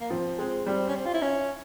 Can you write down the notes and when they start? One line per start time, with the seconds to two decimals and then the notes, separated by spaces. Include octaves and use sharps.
0.01 A#3
0.10 F3 C4
0.39 G#3 C4
0.67 G3 C4
0.88 C#4
0.95 C4
1.06 F4
1.14 E4
1.22 C#4